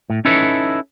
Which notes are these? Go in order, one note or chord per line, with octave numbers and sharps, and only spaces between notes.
A2
C#4 D#4 E4 A4 B4 C#5